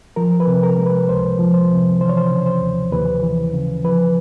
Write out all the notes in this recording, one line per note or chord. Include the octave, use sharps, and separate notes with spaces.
F3 A#4
B4
C3
A#4
G#3
B4
C#2 C5
F3
C5
C3
E3 C5
C#5
C5
C#3
C5
D#2
D#2 B4
E3
C#3
F3 B4